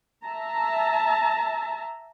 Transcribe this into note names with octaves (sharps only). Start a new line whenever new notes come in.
E5 A5 A#5